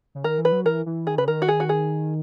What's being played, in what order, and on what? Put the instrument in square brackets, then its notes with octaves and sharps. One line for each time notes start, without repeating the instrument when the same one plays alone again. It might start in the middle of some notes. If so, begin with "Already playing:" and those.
[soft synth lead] C#3
[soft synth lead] D#3 [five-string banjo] A#4
[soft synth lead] E3
[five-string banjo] B4
[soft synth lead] F#3
[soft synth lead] E3 [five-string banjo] A#4
[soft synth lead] E3
[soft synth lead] D#3 [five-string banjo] G#4
[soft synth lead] C#3 [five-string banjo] B4
[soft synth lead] D#3 [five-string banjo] A#4
[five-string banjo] F#4
G#4
F#4
G#4